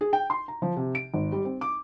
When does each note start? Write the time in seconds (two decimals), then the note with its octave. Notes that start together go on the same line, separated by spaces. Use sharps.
0.01 G#4
0.13 G5
0.30 C6
0.48 A#5
0.62 F3
0.77 C3
0.95 D7
1.14 G#1
1.32 G3
1.45 C4
1.61 D6